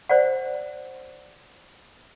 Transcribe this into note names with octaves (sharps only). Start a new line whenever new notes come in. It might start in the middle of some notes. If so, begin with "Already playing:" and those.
C5 D5 F#5